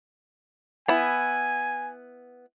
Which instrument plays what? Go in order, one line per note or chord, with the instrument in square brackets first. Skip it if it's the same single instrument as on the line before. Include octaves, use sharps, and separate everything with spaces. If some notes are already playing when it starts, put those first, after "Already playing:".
[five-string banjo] B3 E4 [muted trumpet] G#5